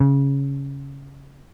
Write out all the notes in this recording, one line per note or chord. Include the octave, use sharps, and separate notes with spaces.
C#3